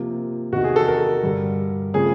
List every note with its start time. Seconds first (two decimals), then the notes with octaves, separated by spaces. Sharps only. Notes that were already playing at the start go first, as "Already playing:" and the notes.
Already playing: C3 F3 A#3
0.52 E2 C3 D#3 F#4
0.64 G#4
0.76 A4
0.88 A#4
1.23 G2 D3 G3
1.94 C#3 F3 A3 C4 G#4